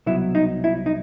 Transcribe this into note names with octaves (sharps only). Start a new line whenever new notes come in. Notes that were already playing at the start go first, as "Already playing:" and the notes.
C2 B2 F#3 E4
D#4
E4
D#4